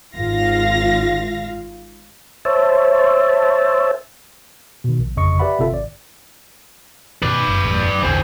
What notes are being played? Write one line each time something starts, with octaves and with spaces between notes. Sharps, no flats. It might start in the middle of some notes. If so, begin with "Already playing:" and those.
G#1 F4 F5 A#6
C5 C#5 E5 A5
B2 D#3
A#1
G1 F2 C#3 D#5 C#6 C#7
G4 B4 D5 E5 F#5 B5
G1 C3 C4 F4 A4 E5
G#1 D5
G#2 B2 D#3 B4 D5
F#1
F#1 E2 A2
A#1 E2 D3 E3 C4